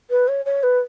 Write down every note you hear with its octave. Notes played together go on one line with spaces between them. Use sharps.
B4
C#5
C#5
B4